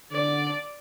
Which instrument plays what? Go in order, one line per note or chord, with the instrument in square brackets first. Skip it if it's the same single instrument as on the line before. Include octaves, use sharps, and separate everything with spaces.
[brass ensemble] D3 [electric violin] D5